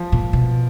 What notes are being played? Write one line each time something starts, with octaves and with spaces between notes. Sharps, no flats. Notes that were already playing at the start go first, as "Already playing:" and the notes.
Already playing: F3
A#2
B2